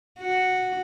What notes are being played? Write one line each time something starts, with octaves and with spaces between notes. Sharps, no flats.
F#4